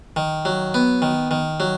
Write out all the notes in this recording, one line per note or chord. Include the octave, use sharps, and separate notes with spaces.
D#3
F#3
B3
D#3
D#3
F#3